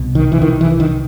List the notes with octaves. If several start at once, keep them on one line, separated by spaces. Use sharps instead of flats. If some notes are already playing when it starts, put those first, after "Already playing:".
Already playing: C2 B2
D#3
E3
D#3
E3
D#3